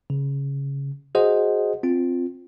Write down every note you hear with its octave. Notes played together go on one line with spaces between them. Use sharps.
C#3
F#4 G#4 C5 D#5 F#5
C4 F4